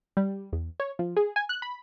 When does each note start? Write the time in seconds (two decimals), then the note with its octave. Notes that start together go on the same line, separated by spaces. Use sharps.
0.17 G3
0.53 E2
0.80 C#5
0.99 F3
1.16 G#4
1.36 G#5
1.49 F#6
1.62 B5